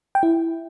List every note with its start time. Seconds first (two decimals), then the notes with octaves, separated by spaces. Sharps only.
0.15 G5
0.23 E4